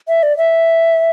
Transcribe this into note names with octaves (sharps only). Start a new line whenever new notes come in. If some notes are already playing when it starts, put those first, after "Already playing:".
E5
D5
E5